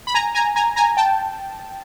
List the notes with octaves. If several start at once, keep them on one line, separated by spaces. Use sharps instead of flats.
B5
G#5 A#5
G#5 A#5
G#5 A#5
G#5 A#5
G5 A5